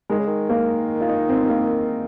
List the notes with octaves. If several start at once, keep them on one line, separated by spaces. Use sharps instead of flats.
D#3 G#3
C#3
D#3
A#3
F4
D#4
C4
C4
A#3